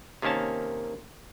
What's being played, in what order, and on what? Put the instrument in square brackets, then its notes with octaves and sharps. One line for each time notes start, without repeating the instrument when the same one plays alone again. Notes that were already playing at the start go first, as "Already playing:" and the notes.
[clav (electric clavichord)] C3 D#3 A#3 C#4 A5